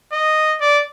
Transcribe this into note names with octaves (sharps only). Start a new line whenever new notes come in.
D#5
D5